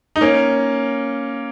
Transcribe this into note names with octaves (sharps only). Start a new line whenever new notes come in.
D#4
A#3 C#4